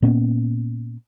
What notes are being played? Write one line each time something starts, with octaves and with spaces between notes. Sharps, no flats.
A#2 A#3 B3 C#4